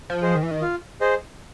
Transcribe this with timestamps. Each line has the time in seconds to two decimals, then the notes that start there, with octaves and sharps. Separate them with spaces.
0.10 F3
0.22 G#4 C5 D#5
0.35 D#3
0.43 E3
0.51 D#3
0.62 F4
1.01 G#4 C5 D#5